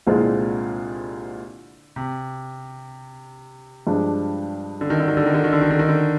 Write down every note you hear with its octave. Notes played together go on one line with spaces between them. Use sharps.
C2 A#2 D3 G#3 C4 F4
C3
G2 F3 G#3 D4
D3
D#3
D3
D#3
D3
D#3
D3
D#3
D3
D#3
D3
D#3
D3